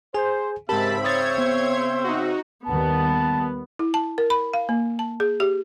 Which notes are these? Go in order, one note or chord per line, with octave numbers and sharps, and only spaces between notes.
G#4 C5 G#5
G#2 C#3 C4 G4 A#4 E5 A5 B5
C5 C#5 D#6 G#6 A6
B3
D#4 F#4
D#2 D#3 G3 B3 A5
E4
A5
A#4
B5
F5
A#3
A5
G#4
G4